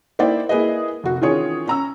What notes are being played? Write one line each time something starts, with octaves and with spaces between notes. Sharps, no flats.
A#3 D#4 E4 C5 D5 G5
A#3 E4 G#4 B4 D#5
F1 F#4
D#3 E3 C#4 F4 G#4 C#5
C#4 A#5 E6